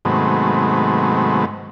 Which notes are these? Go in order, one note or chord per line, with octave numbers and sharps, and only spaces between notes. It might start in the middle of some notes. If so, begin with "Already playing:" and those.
G#2 C3 D#3 F#3 A3 B3